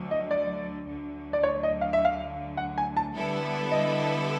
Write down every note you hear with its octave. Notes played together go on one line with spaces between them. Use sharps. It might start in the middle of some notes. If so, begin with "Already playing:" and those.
Already playing: D2 D3 F#3
D#5
D5
D2 D3 F#3
D5
C#5
D#5
F5
E5
F5
F#5
G#5
A5
D3 G3 B3 E4 A4
D#5